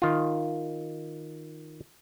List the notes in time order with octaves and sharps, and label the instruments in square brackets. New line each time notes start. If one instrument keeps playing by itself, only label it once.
[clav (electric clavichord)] D#3 F4